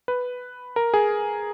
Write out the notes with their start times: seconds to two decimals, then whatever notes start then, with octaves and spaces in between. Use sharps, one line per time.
0.08 B4
0.76 A#4
0.94 G#4